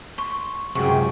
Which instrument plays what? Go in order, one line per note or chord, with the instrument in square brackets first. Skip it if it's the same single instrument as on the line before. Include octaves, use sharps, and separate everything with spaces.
[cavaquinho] C6 C#6
[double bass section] C#2 F#2 [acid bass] C3 [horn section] F#4 G#4 G5 [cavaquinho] C#6